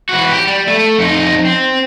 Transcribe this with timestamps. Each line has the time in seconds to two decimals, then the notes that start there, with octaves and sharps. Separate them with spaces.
0.09 E3 F#4
0.31 G4
0.47 G3
0.68 A3
0.98 F2 D#4
1.45 C4